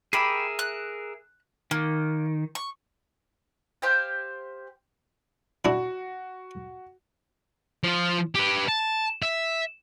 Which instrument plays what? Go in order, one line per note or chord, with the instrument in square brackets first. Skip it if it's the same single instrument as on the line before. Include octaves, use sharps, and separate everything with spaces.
[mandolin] G4 B5 [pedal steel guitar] G#4 A#4 E5
[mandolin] F#6
[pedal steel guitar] D#3 [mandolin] A#3
[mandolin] C#6
G4 C5 F5 G5
[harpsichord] D4 E4 [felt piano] F#4
[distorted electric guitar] F3 F4
G4 B4
A5
E5